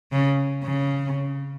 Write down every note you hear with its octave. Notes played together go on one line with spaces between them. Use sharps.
C#3
C#3